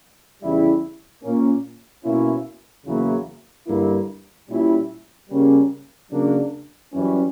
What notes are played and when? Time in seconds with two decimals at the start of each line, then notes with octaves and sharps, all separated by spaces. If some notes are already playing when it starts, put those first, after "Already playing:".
0.41 E2 C#3 G3 C#4 E4
1.23 A#2 A#3 C#4
2.04 B2 A#3 C#4 E4
2.85 E2 C#3 F#3 A#3 E4
3.67 G2 D3 A#3 E4
4.48 A#2 G3 C#4 E4
5.29 C#3 G3 A#3 C#4
6.11 C#3 F#3 A#3 D4
6.92 F#2 E3 G3 C#4